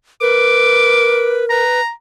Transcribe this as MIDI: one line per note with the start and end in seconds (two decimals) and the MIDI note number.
0.21 1.63 70
0.21 1.45 71
0.21 1.38 86
1.50 1.80 71
1.50 1.90 82